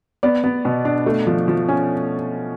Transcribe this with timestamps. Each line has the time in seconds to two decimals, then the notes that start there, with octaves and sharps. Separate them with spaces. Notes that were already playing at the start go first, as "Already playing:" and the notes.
0.23 B3 D5
0.44 B3
0.65 B2
0.85 D4
1.06 A3
1.27 F3
1.48 F3
1.69 C#4